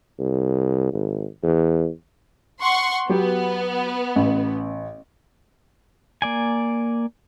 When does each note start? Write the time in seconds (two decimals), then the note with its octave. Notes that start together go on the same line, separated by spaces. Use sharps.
0.19 C2
0.93 G#1
1.43 E2
2.61 F#5 C6 C#6
3.09 F#3 B3 G4
4.16 A1
6.22 A#3 D5 G#5